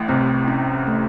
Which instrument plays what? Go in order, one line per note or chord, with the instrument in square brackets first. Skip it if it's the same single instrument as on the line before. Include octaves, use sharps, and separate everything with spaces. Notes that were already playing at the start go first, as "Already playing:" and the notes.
Already playing: [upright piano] A1 A2 [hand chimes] A3
[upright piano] C2 C3 [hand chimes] C4
[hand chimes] C#4
A3